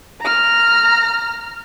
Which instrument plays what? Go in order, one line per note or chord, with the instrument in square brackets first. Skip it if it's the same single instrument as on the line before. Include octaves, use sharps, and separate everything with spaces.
[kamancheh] A#5 F6